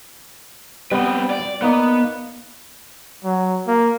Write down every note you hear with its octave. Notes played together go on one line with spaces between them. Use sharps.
G3 B3 C4 B4
D5
A#3 B3 D#4 D5
F#3
A#3